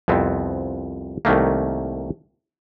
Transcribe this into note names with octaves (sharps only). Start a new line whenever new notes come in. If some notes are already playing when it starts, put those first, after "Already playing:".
C2 F2 B3 C4
C2 D#3 A3 A#3